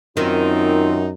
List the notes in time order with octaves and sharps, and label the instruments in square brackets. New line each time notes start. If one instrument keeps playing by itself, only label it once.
[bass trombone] F#2 [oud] D#3 [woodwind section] C4 F4 [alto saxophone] D#4